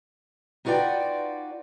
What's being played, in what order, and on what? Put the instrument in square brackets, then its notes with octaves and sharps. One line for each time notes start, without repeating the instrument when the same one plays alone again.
[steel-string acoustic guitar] D#4 F4 F#4 B4 D5 G5